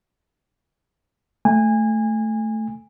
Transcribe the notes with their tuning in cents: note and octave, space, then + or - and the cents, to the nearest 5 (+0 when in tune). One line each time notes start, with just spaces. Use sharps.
A3 +0 G#5 -25